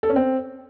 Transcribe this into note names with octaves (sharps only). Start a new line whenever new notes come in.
A4
C#4
C4